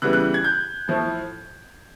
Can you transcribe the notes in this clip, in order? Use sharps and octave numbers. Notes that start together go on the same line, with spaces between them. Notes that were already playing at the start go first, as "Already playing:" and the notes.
C#3 E3 G3 B3 F#6
F#6
G#6
G6
A2 F3 A3